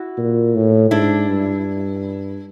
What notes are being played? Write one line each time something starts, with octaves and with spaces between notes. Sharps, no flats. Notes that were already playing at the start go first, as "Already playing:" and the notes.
Already playing: E4 F#4
A#2
A2
G#2 D4 E4
G2